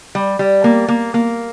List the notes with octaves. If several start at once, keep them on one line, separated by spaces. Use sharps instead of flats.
G3
G3
A#3
A#3
A#3